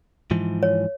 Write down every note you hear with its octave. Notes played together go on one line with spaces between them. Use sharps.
G#2 E3 F3
C#5